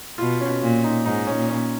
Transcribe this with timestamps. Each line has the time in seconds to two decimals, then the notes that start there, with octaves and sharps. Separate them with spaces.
0.18 B2 F4
0.41 C#4
0.62 A#2
0.84 D#4
1.05 G#2 D#4
1.27 C#4
1.35 A#2
1.49 C#4